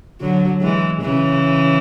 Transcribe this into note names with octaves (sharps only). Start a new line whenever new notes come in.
D3 F#3
E3 G#3
C#3 E3